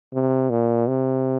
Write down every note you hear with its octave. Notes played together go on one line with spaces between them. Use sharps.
C3
A#2
C3